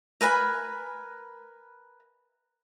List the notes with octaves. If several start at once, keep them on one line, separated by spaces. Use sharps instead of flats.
A#4 B4 G#5 B5